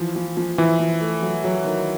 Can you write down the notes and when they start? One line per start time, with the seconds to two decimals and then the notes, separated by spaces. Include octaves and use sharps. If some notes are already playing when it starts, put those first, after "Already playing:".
Already playing: E3 F3
0.16 F3
0.37 F3
0.58 E3 F3
0.80 F3
1.01 A3
1.22 F#3
1.44 F#3
1.65 D#3